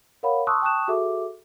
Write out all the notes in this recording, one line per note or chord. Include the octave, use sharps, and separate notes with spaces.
A#4 C#5 F5 F#5 B5
A5 C6 C#6 D#6 E6 F#6
G5 A5 C#6 D#6 F#6 E7
F#4 G#4 A4 E5 D6